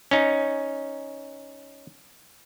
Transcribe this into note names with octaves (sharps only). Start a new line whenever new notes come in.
C#4 D#4